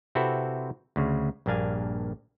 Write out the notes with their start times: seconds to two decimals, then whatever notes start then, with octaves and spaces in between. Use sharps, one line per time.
0.15 C3 C4 E4 F#4 A4 B4
0.96 D2 C#3
1.46 A#1 G2 A#3 D4 F5 G#5